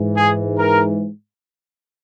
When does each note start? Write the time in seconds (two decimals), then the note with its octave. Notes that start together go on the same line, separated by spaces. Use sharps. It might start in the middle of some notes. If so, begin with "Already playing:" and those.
Already playing: G#2 E3
0.17 G#4
0.58 A#4